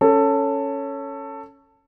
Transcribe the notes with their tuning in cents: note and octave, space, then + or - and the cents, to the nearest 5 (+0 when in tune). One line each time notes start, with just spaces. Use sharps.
C#4 +0 A4 +15